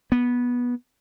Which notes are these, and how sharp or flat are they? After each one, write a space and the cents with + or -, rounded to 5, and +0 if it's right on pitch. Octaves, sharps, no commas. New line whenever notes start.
B3 -15